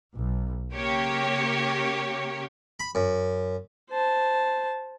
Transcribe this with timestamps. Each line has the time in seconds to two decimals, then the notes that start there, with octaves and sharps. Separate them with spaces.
0.13 B1
0.74 C#3 A#3 G4 C#5
2.80 B5
2.95 F#2
3.90 C5 A5